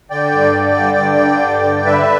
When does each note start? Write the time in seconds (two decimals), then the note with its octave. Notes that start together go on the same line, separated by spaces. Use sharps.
0.10 D3 D5 G5
0.32 G2
0.54 D3
0.76 G2
0.97 D3
1.20 D3
1.42 G2
1.64 D3
1.85 D3 B4 E5